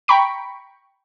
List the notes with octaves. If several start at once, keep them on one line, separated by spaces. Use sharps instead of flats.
G5 A#5 B5 C#6 B6 D7